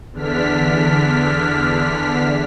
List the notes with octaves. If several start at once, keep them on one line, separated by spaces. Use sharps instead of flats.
E2 D3 D4 F6 B6